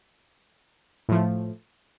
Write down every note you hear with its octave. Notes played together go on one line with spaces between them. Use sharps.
A2 F3 A3